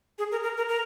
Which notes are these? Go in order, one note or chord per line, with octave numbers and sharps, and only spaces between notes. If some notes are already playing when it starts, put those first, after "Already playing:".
G#4
A#4
A#4
A#4
A#4